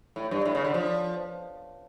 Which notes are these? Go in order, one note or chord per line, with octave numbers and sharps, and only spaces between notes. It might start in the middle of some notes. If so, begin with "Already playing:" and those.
A2
G2
A2
C#3
D3
F3